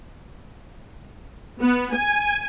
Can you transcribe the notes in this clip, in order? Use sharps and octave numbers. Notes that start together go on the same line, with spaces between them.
B3
G#5